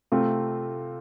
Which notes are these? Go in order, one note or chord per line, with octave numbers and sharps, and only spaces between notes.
C3 A3 C4 F4